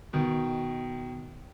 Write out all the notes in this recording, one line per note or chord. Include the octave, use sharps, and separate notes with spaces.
B2 D#3